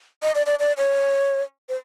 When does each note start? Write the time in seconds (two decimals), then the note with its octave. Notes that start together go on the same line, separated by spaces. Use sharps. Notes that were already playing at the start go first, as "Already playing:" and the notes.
0.23 D#5
0.35 D5
0.46 D5
0.60 D5
0.78 C#5
1.69 C5